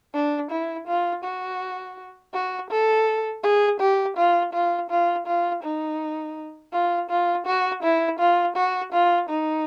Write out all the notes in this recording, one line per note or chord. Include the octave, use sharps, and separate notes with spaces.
D4
E4
F4
F#4
F#4
A4
G#4
G4
F4
F4
F4
F4
D#4
F4
F4
F#4
E4
F4
F#4
F4
D#4